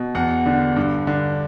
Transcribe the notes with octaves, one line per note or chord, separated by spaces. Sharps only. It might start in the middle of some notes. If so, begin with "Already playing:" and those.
Already playing: B2
E2 F#5
D3
G2
D3